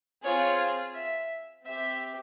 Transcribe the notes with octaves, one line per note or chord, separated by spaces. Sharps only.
C4 F4 G#4 C#5
E5
C4 G4 E5